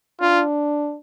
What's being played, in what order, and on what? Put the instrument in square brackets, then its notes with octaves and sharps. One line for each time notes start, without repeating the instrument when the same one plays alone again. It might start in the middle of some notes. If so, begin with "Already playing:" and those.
[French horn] D4 [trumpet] F4